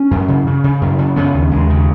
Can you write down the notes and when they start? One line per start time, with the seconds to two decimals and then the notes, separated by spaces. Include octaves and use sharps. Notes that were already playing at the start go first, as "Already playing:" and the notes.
Already playing: C#4
0.11 F#2
0.28 C#3
0.46 C#3
0.64 C#3
0.81 F#2
0.98 C#3
1.16 C#3 B3
1.34 D#2
1.51 D#2 G#3
1.70 C#3